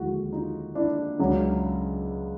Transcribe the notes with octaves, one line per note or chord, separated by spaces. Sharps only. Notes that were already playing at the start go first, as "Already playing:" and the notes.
Already playing: D#2 D3 F3 G#3 E4 F#4
D#4 F4
D4 E4
C#2 C#3 F#3